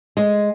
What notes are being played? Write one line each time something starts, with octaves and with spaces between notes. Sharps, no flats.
G#3